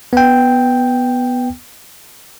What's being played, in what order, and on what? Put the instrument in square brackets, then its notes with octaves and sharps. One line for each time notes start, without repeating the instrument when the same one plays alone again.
[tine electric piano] B3 G5